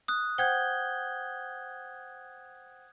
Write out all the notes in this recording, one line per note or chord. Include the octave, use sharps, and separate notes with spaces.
D#6 F#6
C5 F#5 G5 G6 G#6 G7